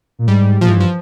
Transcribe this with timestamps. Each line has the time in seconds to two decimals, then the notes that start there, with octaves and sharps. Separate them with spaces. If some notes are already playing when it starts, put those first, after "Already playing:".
0.19 A#2
0.28 G#2 G3
0.61 A#2 F3
0.68 G#2 E3
0.76 G2
0.80 F3